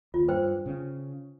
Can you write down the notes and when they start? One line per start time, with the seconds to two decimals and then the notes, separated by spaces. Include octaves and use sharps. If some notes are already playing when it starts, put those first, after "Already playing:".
0.14 D#2 F4
0.28 G2 B4 C5 G5
0.66 C#3 C#4